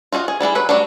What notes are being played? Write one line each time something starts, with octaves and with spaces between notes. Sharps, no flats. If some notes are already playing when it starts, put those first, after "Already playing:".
F4 F#4 G#4 D#5
G#4
G3 D4 E4 G#4
F#3 B4 B5
F#3 G3 A3 D4